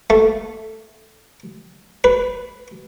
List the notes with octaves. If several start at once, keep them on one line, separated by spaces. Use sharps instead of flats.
A3
B4